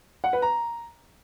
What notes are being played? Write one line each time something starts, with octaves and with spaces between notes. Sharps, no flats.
F#5
B4
A#5